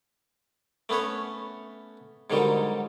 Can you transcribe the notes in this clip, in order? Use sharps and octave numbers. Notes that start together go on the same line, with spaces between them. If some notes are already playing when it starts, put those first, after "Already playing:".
A3 B3 C#4 B4 C#5
G#2 D3 D#3 F#3 G3